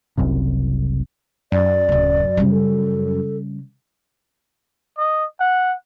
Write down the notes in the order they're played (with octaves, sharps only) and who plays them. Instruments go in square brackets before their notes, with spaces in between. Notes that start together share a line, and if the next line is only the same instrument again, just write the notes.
[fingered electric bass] F#1 C2 F#2 C3
[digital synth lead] F#2 [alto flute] D5
[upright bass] D1 C#3
C#3 G3
[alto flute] A4
[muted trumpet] D#5
F#5